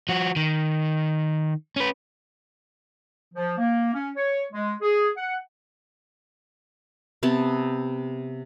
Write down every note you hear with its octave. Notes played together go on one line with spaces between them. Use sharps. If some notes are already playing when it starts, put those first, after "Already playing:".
F3 F#4
D#3
C#4 B4
F3
A#3
C#4
C#5
G#3
G#4
F#5
C3 B3 A5